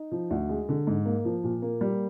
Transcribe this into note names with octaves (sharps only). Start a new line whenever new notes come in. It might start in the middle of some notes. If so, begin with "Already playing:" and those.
Already playing: D#4
F3
D2
G#3
D3
G#2
A#3
F3
A#2
A#3
G3